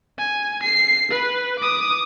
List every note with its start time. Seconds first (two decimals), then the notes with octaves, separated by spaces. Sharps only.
0.18 G#5
0.63 C7
1.11 B4
1.59 D6 D#6